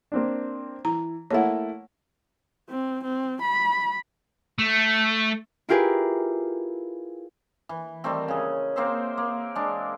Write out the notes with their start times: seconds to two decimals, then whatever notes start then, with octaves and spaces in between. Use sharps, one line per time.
0.12 A#3 C4 D4
0.85 E3 A#5
1.31 A3 A#3 E4 C#5 F#5
2.69 C4
3.04 C4
3.41 B5
4.59 A3
5.69 E4 F4 G4 G#4 A#4 B4
7.69 E3
8.04 D#3 G3 A3 C4
8.28 C#3 G#4
8.76 A#3 C4 C5 E5
9.18 A#3
9.55 G#3 D4